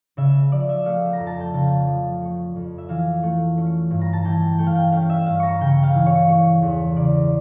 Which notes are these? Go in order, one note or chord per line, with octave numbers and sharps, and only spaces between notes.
C#3 E5
F3 D5
E5
A3 F5
A#5
F2
A5
G5
C#3 F5
F3
A3
F2
E5
E3 F5
A3
C#4
G2
A#5
A5
E3 G5
A3 G5
F5
G5
C#4 F5
E5
G2 F5
A#5 C#6
C#3 G5
F5
E3
C#5
A3 C#5
E2
C#3 D5